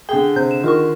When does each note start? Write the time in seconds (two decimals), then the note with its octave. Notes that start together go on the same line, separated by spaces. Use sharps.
0.09 D3 G#4 G5
0.36 C3 G6
0.51 E7
0.64 D#3 F4 A#4 C#6